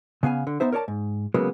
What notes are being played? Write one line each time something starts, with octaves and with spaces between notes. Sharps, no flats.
C#3 B3 F5 G#5
D3
B3 D#4 C5 E5
A#4 C#5 D5 A5
G#2
C#3 F#3 G#3 A#3 B3